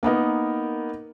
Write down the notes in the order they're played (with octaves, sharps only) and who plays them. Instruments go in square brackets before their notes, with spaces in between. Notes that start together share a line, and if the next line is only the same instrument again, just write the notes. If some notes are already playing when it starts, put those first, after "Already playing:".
[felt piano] A#3 B3 D#4 A#4